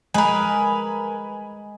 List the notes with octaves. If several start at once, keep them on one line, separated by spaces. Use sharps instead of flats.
G#3 A#4 B4 G#5 B5